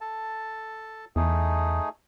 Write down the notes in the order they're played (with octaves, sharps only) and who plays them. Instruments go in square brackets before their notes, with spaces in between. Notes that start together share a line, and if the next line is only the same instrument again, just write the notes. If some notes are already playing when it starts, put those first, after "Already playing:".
[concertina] A4 A5
[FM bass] E2 [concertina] A3 D#4 G#4